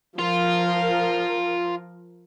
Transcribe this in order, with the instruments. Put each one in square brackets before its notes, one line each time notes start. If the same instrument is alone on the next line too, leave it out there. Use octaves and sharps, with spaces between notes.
[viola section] F3 A#4 [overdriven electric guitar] F4